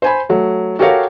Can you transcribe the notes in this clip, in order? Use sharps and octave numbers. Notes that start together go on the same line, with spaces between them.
C5 G#5 B5
F#3 A3
F#4 G4 A4 A#4 C#5 F5